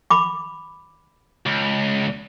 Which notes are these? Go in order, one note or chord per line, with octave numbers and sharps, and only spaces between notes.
B5 D6
C#2